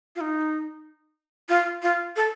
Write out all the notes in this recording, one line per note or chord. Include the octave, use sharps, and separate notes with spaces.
F4
D#4
F4
F4
A4